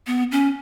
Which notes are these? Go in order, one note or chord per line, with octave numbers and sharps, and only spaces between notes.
B3
C#4